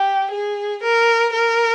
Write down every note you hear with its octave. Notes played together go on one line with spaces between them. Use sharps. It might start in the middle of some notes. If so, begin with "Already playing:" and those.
Already playing: G4
G#4
A#4
A#4